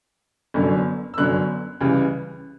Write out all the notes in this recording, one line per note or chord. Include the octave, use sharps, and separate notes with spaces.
G1 F#2 D3 F#3
E6
G1 F#2 D3 F#3 F#6
C#2 C#3 E3 G3